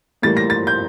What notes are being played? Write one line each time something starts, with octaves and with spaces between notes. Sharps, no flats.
A2 E3 G3 A#3 A6
A#6
A6
G6